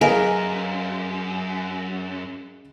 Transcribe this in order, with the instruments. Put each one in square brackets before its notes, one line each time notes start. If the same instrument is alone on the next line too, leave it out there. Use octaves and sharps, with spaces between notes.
[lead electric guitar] F#2 [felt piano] G#4 F5 [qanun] A#4 [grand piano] B4 D#5 G#5